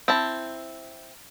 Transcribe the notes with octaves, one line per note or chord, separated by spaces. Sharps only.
C4 E4 A5